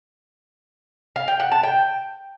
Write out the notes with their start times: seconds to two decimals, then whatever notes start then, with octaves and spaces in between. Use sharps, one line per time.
1.16 F5
1.28 G5
1.40 F#5
1.52 A5
1.63 G5